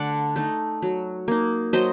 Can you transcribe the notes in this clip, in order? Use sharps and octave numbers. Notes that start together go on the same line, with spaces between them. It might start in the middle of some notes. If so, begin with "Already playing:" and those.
Already playing: D3 A3 D5 F#5
A3 D#4
F#3
A#3 D#4
F#3 C5 D#5